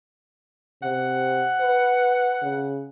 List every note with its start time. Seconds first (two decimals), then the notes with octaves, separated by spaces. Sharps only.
0.83 C3 F#5
1.60 B4
2.42 C#3